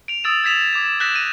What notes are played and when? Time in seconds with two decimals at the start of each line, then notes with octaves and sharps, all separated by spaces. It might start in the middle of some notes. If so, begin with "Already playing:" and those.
0.08 D7 F7
0.24 D#6 E6 A6 D7 E7
0.43 E6 G#6 A6 B6 E7 F7
0.73 D6 G#6 E7
1.00 E6 F#6 G6 A#6 B6 E7
1.15 D#7